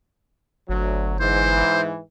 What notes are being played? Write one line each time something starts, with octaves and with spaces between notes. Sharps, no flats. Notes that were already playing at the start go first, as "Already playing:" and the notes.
G1 D2 F#3
G#2 E3 C5